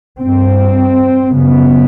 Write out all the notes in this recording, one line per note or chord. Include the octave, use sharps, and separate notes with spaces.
G2 C4
F#2 C#3 B3